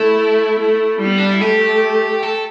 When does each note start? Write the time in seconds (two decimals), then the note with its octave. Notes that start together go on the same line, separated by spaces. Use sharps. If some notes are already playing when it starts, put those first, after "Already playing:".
Already playing: A3 E4
0.59 A3
0.99 G3
1.05 B3
1.18 D4
1.30 E4
1.41 A3 G4
2.23 A4